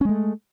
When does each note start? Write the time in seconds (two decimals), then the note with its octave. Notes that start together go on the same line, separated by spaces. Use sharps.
0.01 C#4
0.05 G#3
0.09 A3